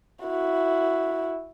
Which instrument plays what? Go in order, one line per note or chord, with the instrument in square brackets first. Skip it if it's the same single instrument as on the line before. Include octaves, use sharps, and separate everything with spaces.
[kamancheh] E4 F#4